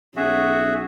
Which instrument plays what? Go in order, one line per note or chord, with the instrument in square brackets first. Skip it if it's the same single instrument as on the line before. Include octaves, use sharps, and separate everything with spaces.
[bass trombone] B1 [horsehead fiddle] C#4 [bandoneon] F#4 G#4 E5